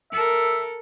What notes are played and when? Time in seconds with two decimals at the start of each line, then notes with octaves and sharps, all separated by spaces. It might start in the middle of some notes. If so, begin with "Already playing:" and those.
0.12 A4 A#4 E5